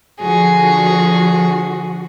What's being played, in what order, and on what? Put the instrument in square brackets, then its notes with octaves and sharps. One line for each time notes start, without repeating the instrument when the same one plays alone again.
[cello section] D3 F3 F#4 [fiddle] G#4